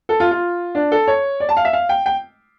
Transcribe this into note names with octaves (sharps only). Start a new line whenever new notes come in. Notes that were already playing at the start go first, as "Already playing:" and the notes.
A4
F4
F4
D4
A4
C#5
D5
A5
F5
E5
F5
G5
G5